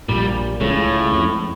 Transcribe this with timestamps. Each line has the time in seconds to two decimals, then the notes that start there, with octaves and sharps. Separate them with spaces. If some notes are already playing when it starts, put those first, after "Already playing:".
0.08 A#1 A#2 G3
0.61 C#2 A2 C#3
1.12 F2